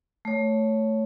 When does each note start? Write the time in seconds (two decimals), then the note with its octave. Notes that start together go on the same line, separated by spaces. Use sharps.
0.25 A3 C#5